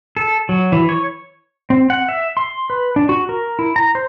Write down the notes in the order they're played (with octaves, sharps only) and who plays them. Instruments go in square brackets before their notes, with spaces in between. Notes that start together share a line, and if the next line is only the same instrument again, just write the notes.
[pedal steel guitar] A4
F#3
E3
C#5
C4
F#5
E5
C6
B4
D4
F#4
A#4
E4
A#5
C5